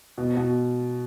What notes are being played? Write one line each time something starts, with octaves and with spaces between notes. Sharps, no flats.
B2
B2